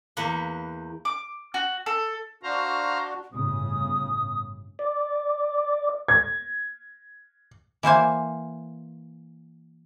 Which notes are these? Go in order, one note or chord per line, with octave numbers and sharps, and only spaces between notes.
E2 A#3 B4 F#5
D6
F#4
A4
D4 F#4 C5 F5 A#5
G1 A2 C#3 D#6
D5
G#6
E3 A#3 C5 G#5